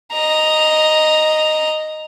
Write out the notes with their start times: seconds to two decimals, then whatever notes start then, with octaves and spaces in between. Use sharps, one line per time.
0.13 D#5 A#5